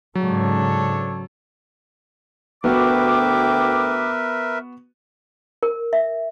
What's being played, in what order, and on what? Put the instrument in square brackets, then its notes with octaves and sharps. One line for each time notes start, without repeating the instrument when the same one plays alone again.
[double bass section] G#2 C#3 [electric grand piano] F#3 [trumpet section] D4 A4 C#5
[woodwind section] D2 G5 D6 [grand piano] B3 F#4 [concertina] A#4 B4 E5
[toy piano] A#4
E5